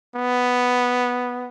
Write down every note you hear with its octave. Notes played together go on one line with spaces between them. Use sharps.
B3